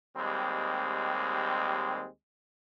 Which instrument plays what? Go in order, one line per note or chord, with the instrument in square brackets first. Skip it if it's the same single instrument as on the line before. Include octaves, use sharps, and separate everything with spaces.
[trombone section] D#2 G3 G#3 C4